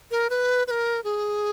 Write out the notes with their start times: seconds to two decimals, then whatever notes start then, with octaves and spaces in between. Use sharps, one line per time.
0.11 A#4
0.30 B4
0.67 B4
0.71 A#4
1.04 G#4